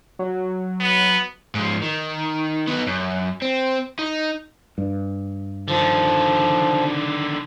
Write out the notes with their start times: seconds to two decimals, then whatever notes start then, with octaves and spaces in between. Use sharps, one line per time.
0.19 F#3
0.80 B3
1.55 G#2 F3
1.82 D#3
2.67 B3 D#4
2.87 F#2
3.42 C4
3.99 D#4
4.78 G2
5.68 D3 D#3 F3